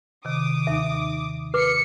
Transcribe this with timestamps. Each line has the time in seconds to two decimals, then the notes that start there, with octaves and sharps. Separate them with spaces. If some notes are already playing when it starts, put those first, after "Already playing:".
0.25 C3 D#3 D6 D#6
0.67 D#2 D#4 E5
1.54 B4 D6 C7 C#7